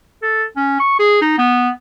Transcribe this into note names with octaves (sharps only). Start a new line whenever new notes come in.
A4
C#4
C#6
G#4
D#4
B3